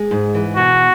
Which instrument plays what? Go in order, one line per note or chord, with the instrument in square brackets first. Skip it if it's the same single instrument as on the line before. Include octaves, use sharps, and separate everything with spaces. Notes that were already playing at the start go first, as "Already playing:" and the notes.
Already playing: [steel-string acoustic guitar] G#3
G#2
E3
[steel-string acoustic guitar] B2 [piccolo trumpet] F#4